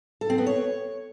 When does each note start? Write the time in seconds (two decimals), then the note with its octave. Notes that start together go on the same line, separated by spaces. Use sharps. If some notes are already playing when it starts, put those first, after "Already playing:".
0.21 A4
0.30 C4
0.38 B3
0.46 C#5